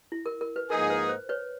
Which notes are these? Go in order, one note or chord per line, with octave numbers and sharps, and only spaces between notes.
E4
A#4
A#4
B4
G#2 F3 A#3 D#4 G#4 A#4
B4
C5
B4 C#5